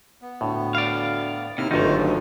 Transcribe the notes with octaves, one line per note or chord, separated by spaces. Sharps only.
B3
D2 A2
D5 F5
D#2 C3 E4 F6
G1 D2 D#3 F#3 A3 A#3 D#4 F4
F3